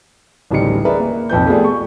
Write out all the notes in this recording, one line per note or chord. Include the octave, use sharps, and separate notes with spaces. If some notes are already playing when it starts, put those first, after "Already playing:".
D1 A1 C#3 G3 D#4 C#7
G#4 A#4 B4 D5 E5
A#3
B1 F2 B4 G6
A3 B3 F4 G4 G#4 D5
C#6